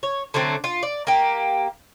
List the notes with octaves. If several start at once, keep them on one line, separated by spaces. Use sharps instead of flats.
C#5
D3 F#3 A3 C4
F4
D5
A#3 G4